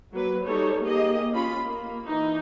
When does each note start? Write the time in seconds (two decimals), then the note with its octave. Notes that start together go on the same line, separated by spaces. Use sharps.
0.12 F#3 A#3 B4
0.45 G3 D#4 A4 C#5
0.83 A#3 G4 G#4 D#5
1.33 C#4 F4 B5
1.63 A#3
2.07 E3 D#4